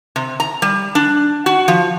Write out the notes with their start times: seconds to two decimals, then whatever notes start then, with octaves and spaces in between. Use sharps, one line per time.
0.16 C3
0.40 A#5
0.62 G3
0.95 D4
1.46 F#4
1.68 F3